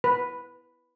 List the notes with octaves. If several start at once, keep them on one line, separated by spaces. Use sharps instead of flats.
B4